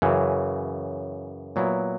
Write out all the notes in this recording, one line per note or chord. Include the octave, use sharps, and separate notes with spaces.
F#2 C#3 E3
A#2 F#3 B3 E4